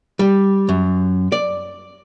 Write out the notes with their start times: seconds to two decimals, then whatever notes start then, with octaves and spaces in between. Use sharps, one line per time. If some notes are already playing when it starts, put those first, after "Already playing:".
0.19 G3
0.69 F#2
1.32 D5